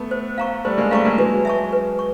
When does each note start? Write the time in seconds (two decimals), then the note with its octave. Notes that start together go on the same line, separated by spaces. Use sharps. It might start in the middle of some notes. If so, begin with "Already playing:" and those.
Already playing: A3 B3
0.11 C5
0.38 F5 A#5 C#6
0.65 G3 A3 C5
0.78 G#3 A#3
0.91 G3 A3 F5 A#5 C#6
1.05 G#3 A#3
1.18 F#3 G#3 B4
1.45 E5 A5 C#6
1.73 B4
1.99 C#6